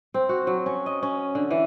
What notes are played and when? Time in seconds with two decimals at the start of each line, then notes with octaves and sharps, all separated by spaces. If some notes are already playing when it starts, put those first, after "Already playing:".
0.14 C4
0.29 F#4
0.47 F#3
0.66 C#4
0.86 D#5
1.03 C#4
1.35 D3
1.51 E3